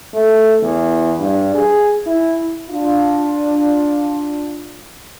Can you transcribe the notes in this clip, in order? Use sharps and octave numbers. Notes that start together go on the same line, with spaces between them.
A3
E2
G2
G#4
E4
D4 F4